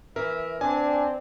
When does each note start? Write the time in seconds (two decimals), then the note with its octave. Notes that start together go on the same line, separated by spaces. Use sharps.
0.16 E3 A#4 E5
0.61 C4 D4 D5 G#5